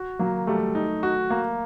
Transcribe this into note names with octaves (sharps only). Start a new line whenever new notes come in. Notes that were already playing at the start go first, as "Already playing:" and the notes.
Already playing: F#4
F#3 A#3
G3 A3
D#4
F#4
A#3